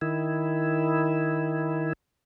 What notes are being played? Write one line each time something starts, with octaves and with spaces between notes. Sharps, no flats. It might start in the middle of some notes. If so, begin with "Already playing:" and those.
D#3 E4